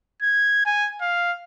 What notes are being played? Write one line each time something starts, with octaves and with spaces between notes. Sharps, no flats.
G#6
G#5
F5